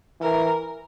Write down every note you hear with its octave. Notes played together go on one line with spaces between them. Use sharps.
E3 A#4